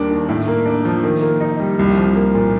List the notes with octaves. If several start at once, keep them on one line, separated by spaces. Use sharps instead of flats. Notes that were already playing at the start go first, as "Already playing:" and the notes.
Already playing: D#2 G3 A#3 D4
D#3
A2
A#3
D4
F3
D#3
A#3
D#4
G3
C2
F3
A#3
A#2